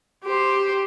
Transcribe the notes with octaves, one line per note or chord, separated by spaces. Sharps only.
G4 C5